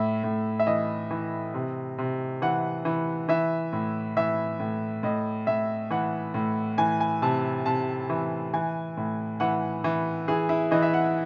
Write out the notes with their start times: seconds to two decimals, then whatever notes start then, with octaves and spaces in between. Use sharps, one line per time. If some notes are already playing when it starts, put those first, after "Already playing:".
Already playing: A2 E5
0.24 A2
0.60 E5
0.67 E3 D#5
1.11 E3
1.54 C3
1.98 C3
2.42 E3 F#5
2.85 E3
3.29 E3 E5
3.73 A2
4.17 E3 E5
4.60 A2
5.03 A2 D#5
5.47 A2 E5
5.91 E3 F#5
6.34 A2
6.78 E3 G#5
7.00 G#5
7.22 C3 A5
7.66 C3 A5
8.10 E3
8.54 E3 G#5
8.97 A2
9.40 E3 F#5
9.84 E3
10.28 E3 G#4
10.49 E4
10.71 E3 D#5
10.82 E5
10.94 F#5